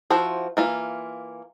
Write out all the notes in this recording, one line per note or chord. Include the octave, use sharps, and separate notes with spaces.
F3 E4 F#4 C5
E3 A#3 F4